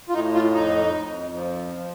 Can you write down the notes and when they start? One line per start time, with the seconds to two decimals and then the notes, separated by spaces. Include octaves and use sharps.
0.09 F4
0.14 A2 D#4
0.34 F4
0.54 F2 D#4
0.94 F2
1.34 F3
1.75 F3